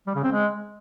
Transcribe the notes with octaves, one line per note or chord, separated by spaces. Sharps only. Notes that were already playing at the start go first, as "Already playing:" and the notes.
G3
C#3
C4
G#3